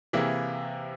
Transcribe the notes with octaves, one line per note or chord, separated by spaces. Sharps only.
C3 E3 A#3 E4 G#4